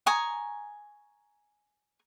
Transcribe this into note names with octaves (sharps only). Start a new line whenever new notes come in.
G#5 A#5 C#6 D#6